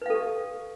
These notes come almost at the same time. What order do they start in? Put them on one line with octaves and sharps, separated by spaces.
B4 F5 A4 G4